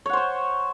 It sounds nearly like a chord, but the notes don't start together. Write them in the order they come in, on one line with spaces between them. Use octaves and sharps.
C#5 F#5 C5 C#6